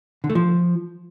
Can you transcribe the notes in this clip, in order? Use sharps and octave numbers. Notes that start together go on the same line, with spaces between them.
D3
A3
F3